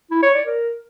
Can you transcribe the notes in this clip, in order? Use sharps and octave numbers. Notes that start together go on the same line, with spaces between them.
E4
C#5
D5
A#4